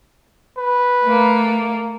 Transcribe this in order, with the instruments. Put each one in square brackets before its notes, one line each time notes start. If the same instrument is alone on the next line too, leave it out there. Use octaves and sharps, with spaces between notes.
[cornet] B4
[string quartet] A3 A#3